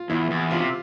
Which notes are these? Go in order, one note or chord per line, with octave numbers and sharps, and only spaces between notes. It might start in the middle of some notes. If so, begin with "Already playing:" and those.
Already playing: F4
E2 E4
E2
C3 F4